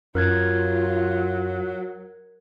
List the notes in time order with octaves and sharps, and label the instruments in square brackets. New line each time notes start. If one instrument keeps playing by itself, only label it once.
[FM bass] F#2 [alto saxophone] F#3 [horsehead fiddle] F4 [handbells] A#4 F#6 G#6